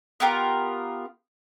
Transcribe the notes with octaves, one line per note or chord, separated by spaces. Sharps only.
B3 F4 G4 A#4